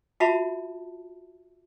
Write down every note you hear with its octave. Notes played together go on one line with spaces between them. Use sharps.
F4 F#4 E5 A5 B5